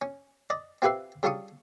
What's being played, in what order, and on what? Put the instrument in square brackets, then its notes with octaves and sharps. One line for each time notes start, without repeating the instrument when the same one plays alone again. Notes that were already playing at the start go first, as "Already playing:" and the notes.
[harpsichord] C#4
D5 D#5
C4 F4 G4 B4 E5 C6
C#3 G3 D4 F4 C#6 D#6